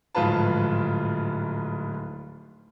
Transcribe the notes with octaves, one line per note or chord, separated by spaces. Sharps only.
D1 G#2 F3 F4 B4 A5